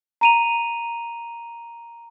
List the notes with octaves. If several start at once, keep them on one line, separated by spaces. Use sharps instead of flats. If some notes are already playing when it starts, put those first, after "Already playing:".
A#5 D#7 F7